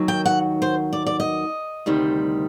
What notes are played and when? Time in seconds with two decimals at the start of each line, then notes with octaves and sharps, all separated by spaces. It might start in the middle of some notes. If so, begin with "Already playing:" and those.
Already playing: D#2 D#3 F#3
0.08 G5
0.26 F#5
0.62 C5
0.93 D5
1.06 D5
1.20 D#5
1.86 D2 C3 D#3 G3